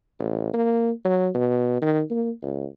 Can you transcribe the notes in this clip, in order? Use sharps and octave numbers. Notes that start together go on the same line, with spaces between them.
A1
A#3
F#3
B2
D#3
A#3
C#2